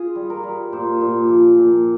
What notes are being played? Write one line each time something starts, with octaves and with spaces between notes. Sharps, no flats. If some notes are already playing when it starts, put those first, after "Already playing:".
Already playing: F4 G#4
G3
A#4
G3
A#2 C5
A#2
F3
A#2